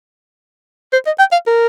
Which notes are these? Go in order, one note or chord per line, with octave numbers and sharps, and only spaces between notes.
C5
D#5
G5
F5
A#4